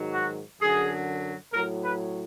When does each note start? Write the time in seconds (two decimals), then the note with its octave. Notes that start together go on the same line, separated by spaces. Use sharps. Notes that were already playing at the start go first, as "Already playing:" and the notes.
Already playing: G#2 D#3 F#3
0.14 F#4
0.60 F#2 D3 F#3 G#4
1.52 A2 A#4
1.56 F#3
1.83 B4